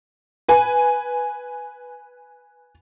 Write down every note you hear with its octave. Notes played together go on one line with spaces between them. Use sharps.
B4 G#5